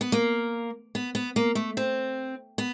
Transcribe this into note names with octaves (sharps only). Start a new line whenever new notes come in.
B3
A#3
B3
B3
A#3
A3
C4
B3